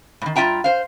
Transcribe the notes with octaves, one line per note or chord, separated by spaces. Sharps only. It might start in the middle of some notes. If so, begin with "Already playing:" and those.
A2 D#3
G2 F4 E5 G5 A#5
C5 F5